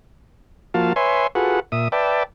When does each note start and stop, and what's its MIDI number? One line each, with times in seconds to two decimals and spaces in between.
0.74 0.93 53
0.74 0.93 58
0.74 0.93 65
0.74 0.93 66
0.74 0.93 77
0.74 0.93 81
0.96 1.27 71
0.96 1.27 73
0.96 1.27 76
0.96 1.27 80
0.96 1.27 84
1.35 1.60 65
1.35 1.60 66
1.35 1.60 68
1.35 1.60 69
1.35 1.60 71
1.35 1.60 78
1.72 1.88 46
1.72 1.88 76
1.72 1.88 87
1.92 2.23 71
1.92 2.23 74
1.92 2.23 76
1.92 2.23 79
1.92 2.23 81